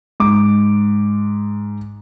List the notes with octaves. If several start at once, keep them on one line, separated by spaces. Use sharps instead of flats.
G#2 D6